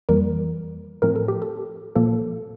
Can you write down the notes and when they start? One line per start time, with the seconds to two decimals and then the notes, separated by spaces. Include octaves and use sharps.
0.09 F2 E3 G3 A#3 A#4
1.02 A2 F3 A3 C4 A#4
1.16 A4
1.28 G4
1.42 A4
1.95 A#2 F3 A#3 A4